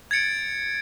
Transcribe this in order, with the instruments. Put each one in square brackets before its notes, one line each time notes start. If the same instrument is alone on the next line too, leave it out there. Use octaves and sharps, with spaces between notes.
[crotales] G#6 A6 C#7 D7